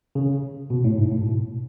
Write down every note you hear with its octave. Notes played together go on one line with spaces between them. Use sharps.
C#3
B2
A2
G#2
A2
B2